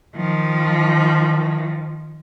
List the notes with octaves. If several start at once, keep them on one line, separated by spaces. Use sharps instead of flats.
D#3 F3